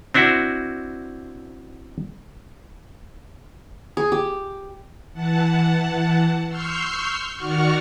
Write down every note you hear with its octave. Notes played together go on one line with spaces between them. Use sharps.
C4 D4 E4 F#4
G#4
G4
E3 F#5 A5
C6 C#6 E6 F6 G6 C7
D#3 F#4 D5 F#5 C#6 F6